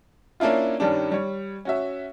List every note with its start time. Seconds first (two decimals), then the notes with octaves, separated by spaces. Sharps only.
0.40 A#3 C#4 D4 E4 F4
0.80 G2 D#3 G3 C#4 D4
1.12 G3 C#5
1.65 C#4 F#4 E5